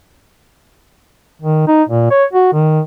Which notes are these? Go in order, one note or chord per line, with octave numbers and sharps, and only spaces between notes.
D#3
D#4
A#2
C#5
F#4
D#3